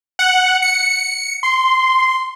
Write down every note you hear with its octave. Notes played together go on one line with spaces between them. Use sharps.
F#5
C#7
C6